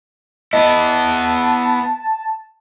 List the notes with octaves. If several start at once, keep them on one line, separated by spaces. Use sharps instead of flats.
B3 E4 D#5 A5